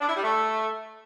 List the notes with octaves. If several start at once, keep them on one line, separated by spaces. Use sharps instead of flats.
D4
E4
G3
A3